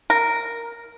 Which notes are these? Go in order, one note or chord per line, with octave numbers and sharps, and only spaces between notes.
A#4